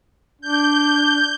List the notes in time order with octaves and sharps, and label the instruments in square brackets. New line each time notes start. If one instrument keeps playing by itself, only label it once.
[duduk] D4 [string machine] G6